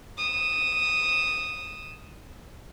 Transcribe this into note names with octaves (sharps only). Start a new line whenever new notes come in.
D#6 E7